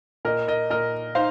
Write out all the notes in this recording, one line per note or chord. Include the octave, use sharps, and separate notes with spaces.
A#2 A#4 D#5
A#4 D#5
A#2 A#4 D#5
D#4 C5 F5